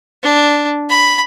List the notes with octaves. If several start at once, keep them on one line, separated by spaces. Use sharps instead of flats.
D4
B5